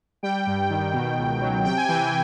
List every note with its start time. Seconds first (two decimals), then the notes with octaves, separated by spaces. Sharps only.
0.23 G3 G5
0.47 G2
0.70 D#3
0.93 B2
1.18 C#2
1.41 F#3
1.65 C3 G5
1.77 G#5
1.89 E3 G5